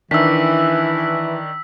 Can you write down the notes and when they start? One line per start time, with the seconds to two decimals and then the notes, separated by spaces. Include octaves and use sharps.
0.11 D#3 E3 D4 E6 B6